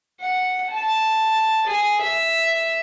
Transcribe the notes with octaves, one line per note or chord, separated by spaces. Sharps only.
F#5
A5
G#4
E5